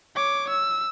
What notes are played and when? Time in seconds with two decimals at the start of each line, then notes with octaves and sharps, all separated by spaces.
0.15 C#5 D6
0.49 E6